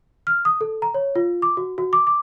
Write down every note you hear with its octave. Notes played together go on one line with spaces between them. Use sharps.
F6
D#6
A4
A#5
C#5
F4
D6
F#4
F#4
D6
D6